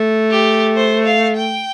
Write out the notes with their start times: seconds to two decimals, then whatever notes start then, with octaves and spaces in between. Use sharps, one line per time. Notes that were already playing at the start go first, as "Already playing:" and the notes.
Already playing: A3
0.31 G4
0.76 C5
1.06 F5
1.36 G5